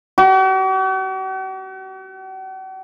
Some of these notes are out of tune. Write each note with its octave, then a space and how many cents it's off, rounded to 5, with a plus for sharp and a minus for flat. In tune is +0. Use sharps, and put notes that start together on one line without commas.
F#4 +45